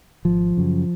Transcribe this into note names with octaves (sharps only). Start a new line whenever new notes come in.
G#1 F3
F#2 C#3